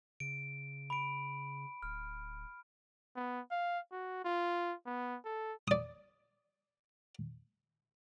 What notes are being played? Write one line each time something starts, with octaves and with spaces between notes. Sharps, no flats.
C#3 D7
B5 D7
D1 F6
B3
F5
F#4
F4
B3
A4
D5 D#6